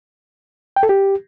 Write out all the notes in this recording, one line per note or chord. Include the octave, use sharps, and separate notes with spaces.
G5
A4
G4